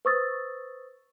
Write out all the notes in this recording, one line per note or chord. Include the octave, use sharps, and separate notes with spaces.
B4 C5 C#6 D#6 E6 A6